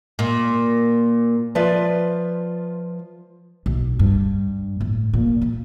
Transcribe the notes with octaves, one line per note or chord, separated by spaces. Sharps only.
A#2
F3 F4 B4 D5 E5
B1
G2
A2
A#2
A#2